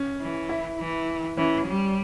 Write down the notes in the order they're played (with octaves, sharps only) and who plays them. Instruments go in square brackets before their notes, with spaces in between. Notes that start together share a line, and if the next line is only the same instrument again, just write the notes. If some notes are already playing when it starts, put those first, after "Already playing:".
Already playing: [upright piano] C#4
[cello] E3
[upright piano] E4
[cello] E3
[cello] E3 [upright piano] C#4
[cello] G3